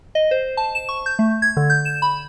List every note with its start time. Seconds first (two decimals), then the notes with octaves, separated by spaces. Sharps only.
0.15 D#5
0.31 C5
0.57 A5
0.75 E7
0.89 C#6
1.06 G6
1.19 A3
1.42 G#6
1.57 D3
1.70 G6
1.85 E7
2.02 B5